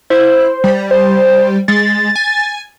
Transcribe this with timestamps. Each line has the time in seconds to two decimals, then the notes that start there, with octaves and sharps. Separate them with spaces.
0.10 E4 C5
0.64 G3
0.91 C5
1.68 G#3 A6
2.15 G#5